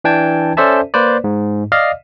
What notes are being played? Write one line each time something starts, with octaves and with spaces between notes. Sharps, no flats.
E3 D4 G5 A5 G#6
C#4 A4 C5 D5 E5 A5
A#3 B4 C5 D5
G#2
D5 D#5 F5 F6